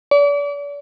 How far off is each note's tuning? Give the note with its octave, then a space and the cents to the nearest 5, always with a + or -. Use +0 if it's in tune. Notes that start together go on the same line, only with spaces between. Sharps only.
D5 -40